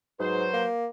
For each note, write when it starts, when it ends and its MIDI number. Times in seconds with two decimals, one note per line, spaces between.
0.20 0.46 44
0.20 0.65 54
0.20 0.65 71
0.20 0.65 72
0.54 0.87 58